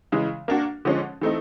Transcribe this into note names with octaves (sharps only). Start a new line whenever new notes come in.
C#3 E3 G#3
A#3 D4 F#4
D3 F3 G#3 C#4
E3 A3 C4 D#4